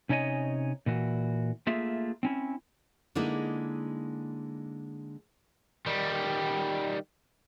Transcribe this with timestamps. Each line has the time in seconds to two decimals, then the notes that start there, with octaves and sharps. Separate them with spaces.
0.09 C3 C#4 D#4 C#5 D#5 G#5
0.86 A#2 E3 F#4
1.67 A3 A#3 F4 G#4 E5
2.23 C4 C#4 E4
3.15 D3 G#3 A#3 D#4 E4
5.86 D#3 G3